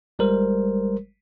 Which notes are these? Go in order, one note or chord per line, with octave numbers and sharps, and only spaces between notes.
G1 G3 G#3 A#4 C5